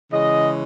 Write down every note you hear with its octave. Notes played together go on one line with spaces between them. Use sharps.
C#3 E3 G#3 C#4 D#5